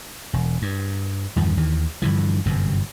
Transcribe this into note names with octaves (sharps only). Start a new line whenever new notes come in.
E1
G2
E2 G2 D#3 F3
D#2 D#3 E3
G2 D3 E3 F3
G1 F#2 C3